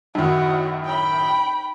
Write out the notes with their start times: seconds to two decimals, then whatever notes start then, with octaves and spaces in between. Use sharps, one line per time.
0.15 F#2 A2 D#3 D#4 F#4 D#5
0.85 G5 B5